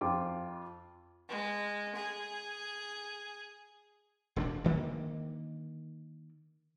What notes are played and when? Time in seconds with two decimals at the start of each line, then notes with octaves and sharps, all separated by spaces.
0.01 F2 F4 F5 G5 D6
1.29 G#3
1.96 G#4
4.36 E1 C4 D4
4.64 D3 D#3 A3 A#3